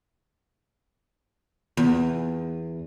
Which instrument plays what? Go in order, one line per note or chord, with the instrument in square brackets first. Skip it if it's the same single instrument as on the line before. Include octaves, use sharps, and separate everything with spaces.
[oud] E2